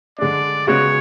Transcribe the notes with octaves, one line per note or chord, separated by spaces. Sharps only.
D3 G#3 D4 D5
C#3 G#3 B3 F#4 C#5